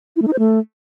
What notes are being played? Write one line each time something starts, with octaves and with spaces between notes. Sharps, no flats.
E4
A3
D#4
C5
A3